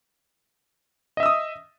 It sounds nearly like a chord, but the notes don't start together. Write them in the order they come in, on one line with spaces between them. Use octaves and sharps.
D#5 E5 E6 D#6